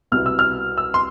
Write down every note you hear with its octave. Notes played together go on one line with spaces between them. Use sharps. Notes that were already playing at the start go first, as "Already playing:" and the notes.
C2 B2 B3 E4 F6
E6
F6
E6
C6